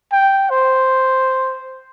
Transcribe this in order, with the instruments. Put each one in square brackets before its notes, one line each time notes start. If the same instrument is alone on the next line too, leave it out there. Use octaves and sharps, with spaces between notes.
[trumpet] G5
C5